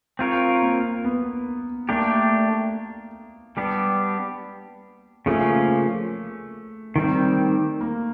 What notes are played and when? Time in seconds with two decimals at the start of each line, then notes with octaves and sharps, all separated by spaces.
0.19 C4 F4 A#4 C#5
0.62 A#3
1.04 B3
1.89 A3 A#3 D4 G4
3.57 G3 B3 D4 G4
5.26 C#3 F3 A3 A#3 C#4
6.96 D#3 G3 C4
7.81 A#3